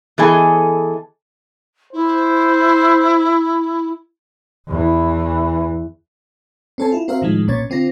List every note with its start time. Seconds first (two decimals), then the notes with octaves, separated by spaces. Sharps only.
0.18 E3 B3 G#4 A4 D#5 G#5
1.93 E4 C5
4.67 E2 E3
6.78 C4 C#4 A4 C5 G#5 A5
6.92 E4 F4
7.08 C4 F#4 A#4 C5 E5 F5
7.22 A2 D#3 F3 G#3
7.48 B1 A#2 C#4 C#5 G#6 A6
7.70 D3 C4 F4 A#6